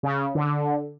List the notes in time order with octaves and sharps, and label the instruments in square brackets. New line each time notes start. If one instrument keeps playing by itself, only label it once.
[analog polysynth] C#3
D3